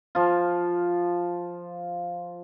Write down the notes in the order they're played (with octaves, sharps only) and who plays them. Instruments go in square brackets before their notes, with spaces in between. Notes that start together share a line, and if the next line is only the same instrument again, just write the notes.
[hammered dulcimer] F3 F4